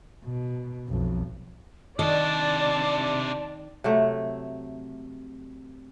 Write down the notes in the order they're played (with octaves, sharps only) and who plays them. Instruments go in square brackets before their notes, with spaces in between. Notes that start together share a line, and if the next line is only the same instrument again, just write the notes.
[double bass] B2
B1 F2
[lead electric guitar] C3 D4 [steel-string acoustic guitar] D#3 D#5 [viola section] D5 [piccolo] A5
[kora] C3 F#3 A3